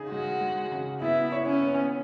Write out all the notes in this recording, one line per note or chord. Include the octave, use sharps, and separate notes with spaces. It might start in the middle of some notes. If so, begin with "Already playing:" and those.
Already playing: C#3 D#4 G#4
G#3 F#4
G#3
C#3
B3 E4
C#5
C#4
B3